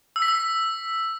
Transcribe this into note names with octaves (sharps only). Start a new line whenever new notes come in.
E6
B6
E6